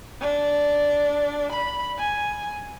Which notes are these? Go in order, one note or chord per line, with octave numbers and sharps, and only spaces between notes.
D4
B5
G#5